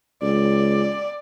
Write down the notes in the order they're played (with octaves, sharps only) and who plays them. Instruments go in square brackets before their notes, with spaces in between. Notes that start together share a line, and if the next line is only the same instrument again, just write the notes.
[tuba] C#2 [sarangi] D5